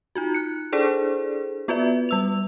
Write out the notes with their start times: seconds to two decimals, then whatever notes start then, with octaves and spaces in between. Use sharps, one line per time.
0.15 D#4 F4 F#4
0.34 F#6 C#7
0.72 D4 E4 G#4 A4 C5 D5
1.68 B3 F4 F#4 B4 D5 E5
2.09 G3 E6 F7